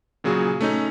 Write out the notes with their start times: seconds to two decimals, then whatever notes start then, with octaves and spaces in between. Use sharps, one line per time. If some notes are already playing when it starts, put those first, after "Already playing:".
0.24 A#2 C#3 F#3 F#4 G#4
0.61 A3 C#4 D#4